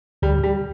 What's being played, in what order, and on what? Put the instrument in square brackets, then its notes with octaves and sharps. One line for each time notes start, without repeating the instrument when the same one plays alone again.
[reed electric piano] D2 [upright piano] G3
[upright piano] G3